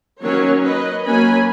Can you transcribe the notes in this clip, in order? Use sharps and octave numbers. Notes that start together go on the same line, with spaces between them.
D#3 F#3 A#3 C#4 A#4 C#5
B4 D#5
F#3 A#3 C#4 G#5 B5